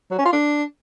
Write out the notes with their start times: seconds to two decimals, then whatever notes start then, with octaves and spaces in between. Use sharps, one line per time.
0.11 F#3
0.18 C#4
0.25 F4
0.33 D4